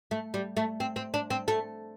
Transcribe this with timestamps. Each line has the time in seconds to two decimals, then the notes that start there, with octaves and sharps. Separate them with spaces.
0.11 A3
0.34 G3
0.57 A3
0.80 C4
0.96 C4
1.14 D4
1.30 C4
1.48 A3